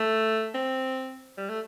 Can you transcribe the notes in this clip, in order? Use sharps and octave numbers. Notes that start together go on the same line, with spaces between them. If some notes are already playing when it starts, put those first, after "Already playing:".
Already playing: A3
C4
G3
A3